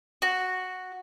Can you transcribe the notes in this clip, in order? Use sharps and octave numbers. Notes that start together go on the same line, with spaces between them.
F#4